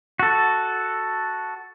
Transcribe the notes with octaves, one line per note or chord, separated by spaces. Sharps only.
F#4 A4